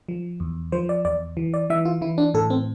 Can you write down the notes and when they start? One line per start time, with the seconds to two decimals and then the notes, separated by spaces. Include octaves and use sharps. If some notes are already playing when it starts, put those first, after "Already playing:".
0.09 F3
0.40 E2
0.72 F3 C5
0.89 D5
1.05 E2 D5
1.37 E3
1.54 D5
1.70 E3 E5
1.85 F4
2.02 E3 E4
2.18 D4
2.34 A2 A4
2.50 C4